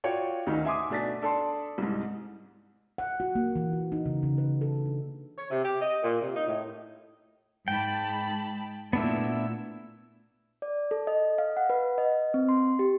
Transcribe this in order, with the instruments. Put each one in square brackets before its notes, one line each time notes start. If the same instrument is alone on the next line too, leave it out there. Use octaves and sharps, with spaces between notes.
[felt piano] F4 F#4 C#5 D5 G5
D2 D#3 C#4 D#4
E5 G#5 C6 D6 D#6
B2 A3 D4 A6 B6
D4 A4 D5 A5 C6
C2 G#2
[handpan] F#5
F#4
A#3
E3
F#4
D#4
C#3
C#3
B4
A4
D4
[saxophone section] C#5
C3
G4
D#5
A#2
C3
D#4
A2
[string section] G#2 A5 B5 [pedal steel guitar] G5
[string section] A#2 A3 E6 [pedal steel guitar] B3 D4 E4
[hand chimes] D5
A4
D#5
F5
F#5
B4
D#5
C4
C6
G4